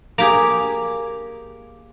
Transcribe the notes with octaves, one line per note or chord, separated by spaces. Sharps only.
A#3 G4 G#4